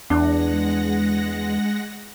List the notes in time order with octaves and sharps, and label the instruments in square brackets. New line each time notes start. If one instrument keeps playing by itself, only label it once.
[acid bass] E2 [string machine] G#3 F#5 A#6 [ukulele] D4